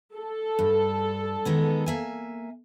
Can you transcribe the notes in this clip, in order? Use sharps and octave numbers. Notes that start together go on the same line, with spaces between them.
A4
G2
D#3 G#3 B3
A#3 E5 G#5